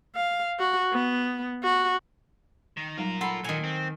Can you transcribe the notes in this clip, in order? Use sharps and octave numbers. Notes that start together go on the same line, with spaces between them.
F5
F#4
B3
F#4
D#3
F#3 G3 D#4 F4 A#4
A4 F#5 B5 C6
A#2 D#3 G#5
C4